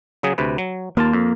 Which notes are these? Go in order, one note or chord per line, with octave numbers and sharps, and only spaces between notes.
C#3 F#3 G#4
D2 C3 B4
F#3
D#2 A#3 F4 A5
F2